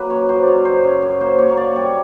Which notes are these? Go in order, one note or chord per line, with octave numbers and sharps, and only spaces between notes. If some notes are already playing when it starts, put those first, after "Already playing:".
Already playing: F#3 A#3 B4
F#2 C#5
F#3 C5
C#3 C#5 D5
F#2 C5
C#3 C#5
F#2
A#3 C5
A#3 C#5
C#5
A#3 D5
G3 C#5